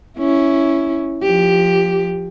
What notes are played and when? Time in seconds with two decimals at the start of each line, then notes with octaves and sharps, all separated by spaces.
0.18 C#4 E4
1.23 F3 G4